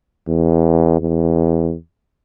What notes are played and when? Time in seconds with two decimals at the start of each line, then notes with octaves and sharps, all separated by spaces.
0.28 E2
1.00 E2